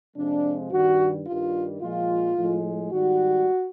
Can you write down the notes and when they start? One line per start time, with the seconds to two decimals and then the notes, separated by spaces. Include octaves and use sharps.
0.16 F2 C3 F3 G#3 D4
0.71 G2 D#3 G3 F#4
1.26 G2 D#3 G3 F4
1.82 A#2 F3 G#3 F4
2.37 A2 F3 G#3
2.92 G#2 D#3 G3 F#4